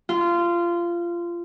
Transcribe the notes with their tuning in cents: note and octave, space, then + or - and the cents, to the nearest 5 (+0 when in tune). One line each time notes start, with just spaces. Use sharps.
F4 -20